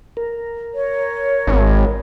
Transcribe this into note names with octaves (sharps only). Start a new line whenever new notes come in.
A#4
C#5
G#1